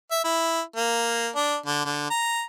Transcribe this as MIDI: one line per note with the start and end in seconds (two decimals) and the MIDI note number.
0.11 0.20 76
0.24 0.61 64
0.76 1.28 58
1.35 1.57 62
1.66 1.84 50
1.85 2.09 50
2.10 2.43 82